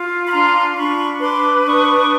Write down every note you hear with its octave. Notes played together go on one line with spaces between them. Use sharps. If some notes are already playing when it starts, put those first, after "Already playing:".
Already playing: F4
B5
D4 A#5 C6
D4 B5 C#6
B4 C6 D6
D4 C#6 D#6